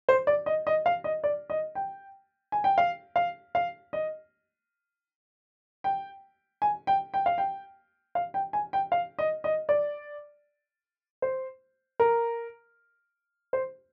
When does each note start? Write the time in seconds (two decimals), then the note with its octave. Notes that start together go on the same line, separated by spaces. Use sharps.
0.09 C5
0.27 D5
0.46 D#5
0.67 D#5
0.86 F5
1.04 D#5
1.24 D5
1.50 D#5
1.75 G5
2.52 G#5
2.64 G5
2.78 F5
3.16 F5
3.55 F5
3.93 D#5
5.84 G5
6.62 G#5
6.87 G5
7.14 G5
7.26 F5
7.38 G5
8.15 F5
8.34 G5
8.53 G#5
8.73 G5
8.92 F5
9.19 D#5
9.44 D#5
9.69 D5
11.22 C5
12.00 A#4
13.53 C5